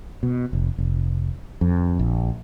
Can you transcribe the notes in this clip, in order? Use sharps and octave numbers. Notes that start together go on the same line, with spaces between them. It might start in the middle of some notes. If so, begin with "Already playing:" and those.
B2
F1
F1
F2
A#1